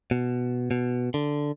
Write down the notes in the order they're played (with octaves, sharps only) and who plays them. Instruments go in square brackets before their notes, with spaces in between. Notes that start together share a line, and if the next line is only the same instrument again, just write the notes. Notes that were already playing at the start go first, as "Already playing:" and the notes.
[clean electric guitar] B2
B2
D3